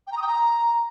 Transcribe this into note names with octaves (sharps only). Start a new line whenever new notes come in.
G5
A#5
D#6
G5
A#5